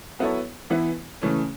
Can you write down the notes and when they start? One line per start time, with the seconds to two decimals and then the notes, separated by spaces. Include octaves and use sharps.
0.19 F#3 B3 E4 A4 C#5
0.70 E3 B3 E4
1.22 C#3 E3 A3 C#4